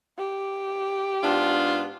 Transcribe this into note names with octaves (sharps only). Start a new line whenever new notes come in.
G4
G#2 B3 D4 F4